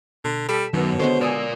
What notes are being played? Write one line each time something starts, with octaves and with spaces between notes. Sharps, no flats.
B2 D3
G3 A4 B6 E7
F#2 B2 D#3 B3
D3 G#3 B3 C5 C#5
A#4 D5 G#5 D#6 E6